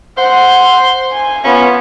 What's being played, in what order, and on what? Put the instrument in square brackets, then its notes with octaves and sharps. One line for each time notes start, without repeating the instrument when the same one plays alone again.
[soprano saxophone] C5 [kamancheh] F#5
[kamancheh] G#5
[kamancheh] B3 F4 [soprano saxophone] C#4